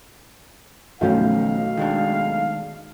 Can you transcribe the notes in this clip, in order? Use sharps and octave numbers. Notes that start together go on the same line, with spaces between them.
B1 D#3 F3 A3 C#4 F5
D#3 G#3 D4